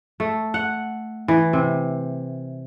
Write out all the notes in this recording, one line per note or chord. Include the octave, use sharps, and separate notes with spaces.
A3
F#5
E3
C3